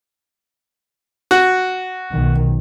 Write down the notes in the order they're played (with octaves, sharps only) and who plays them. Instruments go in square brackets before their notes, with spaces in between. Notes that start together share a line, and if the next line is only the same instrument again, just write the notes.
[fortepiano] F#4
[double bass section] B1 D#3